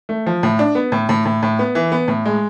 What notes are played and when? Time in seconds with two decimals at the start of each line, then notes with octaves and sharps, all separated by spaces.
0.09 A3
0.26 F3
0.43 A2
0.59 D4
0.75 B3
0.92 A2
1.09 A2
1.25 A2
1.43 A2
1.59 B3
1.75 E3
1.92 B3
2.08 A2
2.26 G#3